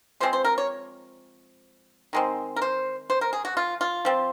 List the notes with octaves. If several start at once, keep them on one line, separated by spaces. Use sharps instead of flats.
F3 G#3 C4 C5
C5
A#4
C#5
D#3 G#3 C4
A#4
C5
C5
A#4
G#4
F#4
F4
F4
F3 C4